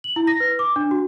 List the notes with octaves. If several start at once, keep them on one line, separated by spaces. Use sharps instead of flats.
F#7
E4
A#6
B4
D6
D4
F#4